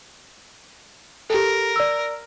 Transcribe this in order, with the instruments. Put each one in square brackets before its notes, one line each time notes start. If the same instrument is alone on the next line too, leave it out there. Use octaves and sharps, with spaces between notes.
[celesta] G4 A4 [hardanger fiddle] A#4
[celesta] D5 E6